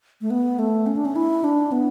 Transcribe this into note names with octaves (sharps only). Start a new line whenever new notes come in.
A3
B3
A3
C#4
D4
C#4
E4
D4
B3